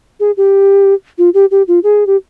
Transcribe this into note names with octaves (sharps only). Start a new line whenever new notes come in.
G#4
G4
F4
G4
G4
F4
G#4
G4